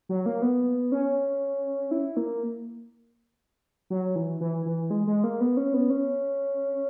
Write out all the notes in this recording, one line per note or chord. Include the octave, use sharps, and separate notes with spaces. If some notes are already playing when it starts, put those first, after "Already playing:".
F#3
A#3
B3
C#4
E4
A#3
F#3
E3
E3
E3
G#3
G#3
A#3
B3
C#4
B3
C#4